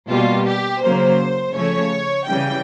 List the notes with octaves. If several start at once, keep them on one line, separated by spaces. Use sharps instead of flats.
B2 G3 A#3 F4
G4
C#3 F#3 A#3 C5
C#3 F3 A3 C#5
C#3 E3 G3 G5